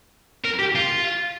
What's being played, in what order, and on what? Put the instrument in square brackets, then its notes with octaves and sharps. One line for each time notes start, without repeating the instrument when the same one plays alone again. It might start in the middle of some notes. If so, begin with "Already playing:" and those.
[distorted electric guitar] A#4
G4
F4